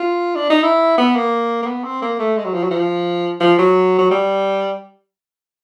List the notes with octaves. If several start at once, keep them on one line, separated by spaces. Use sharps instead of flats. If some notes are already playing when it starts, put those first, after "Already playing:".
Already playing: F4
D4
D#4
E4
B3
A#3
A#3
B3
C4
A#3
A3
G#3
F#3
F3
F#3
F3
F3
F#3
F#3
G3